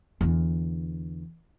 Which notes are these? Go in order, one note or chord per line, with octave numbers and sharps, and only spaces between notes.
E2 D3